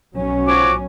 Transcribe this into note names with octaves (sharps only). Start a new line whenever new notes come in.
B1 F#3 C#4
F3 F#4 C#5 D6